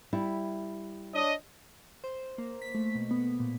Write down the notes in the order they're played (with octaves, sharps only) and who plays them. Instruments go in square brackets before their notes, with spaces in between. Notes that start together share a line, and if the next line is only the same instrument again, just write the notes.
[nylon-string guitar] G3 E4
[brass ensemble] D4 C#5 D#5
[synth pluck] C5
A#3
B6
A3
B2
B3
A#2